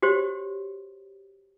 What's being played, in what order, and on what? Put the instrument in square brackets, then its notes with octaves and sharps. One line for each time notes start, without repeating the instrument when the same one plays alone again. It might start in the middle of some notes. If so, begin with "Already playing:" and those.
[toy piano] F#4 G4 C5 C#5